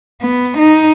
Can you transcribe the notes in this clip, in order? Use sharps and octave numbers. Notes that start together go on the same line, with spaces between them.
B3
D#4